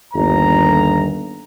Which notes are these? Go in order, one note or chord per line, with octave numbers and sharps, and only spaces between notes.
G1 D#2 A#5